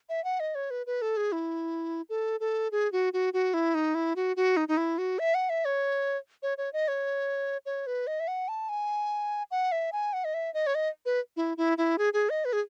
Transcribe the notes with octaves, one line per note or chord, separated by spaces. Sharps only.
E5
F#5
D#5
C#5
B4
B4
A4
G#4
E4
A4
A4
G#4
F#4
F#4
F#4
E4
D#4
E4
F#4
F#4
D#4
D#4
E4
F#4
E5
F#5
E5
C#5
C#5
C#5
D#5
C#5
C#5
B4
D#5
E5
F#5
A5
G#5
F#5
E5
G#5
F#5
D#5
E5
D#5
C#5
D#5
B4
E4
E4
E4
G#4
G#4
D#5
B4
G#4